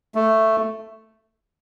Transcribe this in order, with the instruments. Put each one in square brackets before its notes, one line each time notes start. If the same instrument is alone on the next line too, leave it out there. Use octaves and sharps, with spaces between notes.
[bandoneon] A3